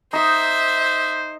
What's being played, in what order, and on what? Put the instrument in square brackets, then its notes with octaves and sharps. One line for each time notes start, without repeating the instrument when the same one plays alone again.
[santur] D#4 D#6 [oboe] C5 [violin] E5